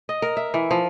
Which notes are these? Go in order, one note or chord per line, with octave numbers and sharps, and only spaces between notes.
D#5
A#4
E5
E3
F3